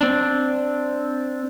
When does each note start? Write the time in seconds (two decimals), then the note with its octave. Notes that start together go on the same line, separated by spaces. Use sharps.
0.01 C4 D4